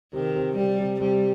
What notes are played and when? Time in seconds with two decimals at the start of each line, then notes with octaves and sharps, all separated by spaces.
0.13 C3 D#3
0.35 C3
0.56 C3 G3
0.78 C3
1.00 C3 G3